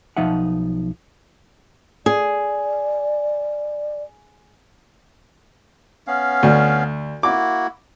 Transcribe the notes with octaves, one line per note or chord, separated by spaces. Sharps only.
B1 F3 D#4 E5 F#5
G#4 D5
B3 C#4 F5
D2
A#3 E4 F#4 D6